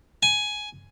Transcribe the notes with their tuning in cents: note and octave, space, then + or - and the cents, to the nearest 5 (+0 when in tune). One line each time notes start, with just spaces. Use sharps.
G#5 +10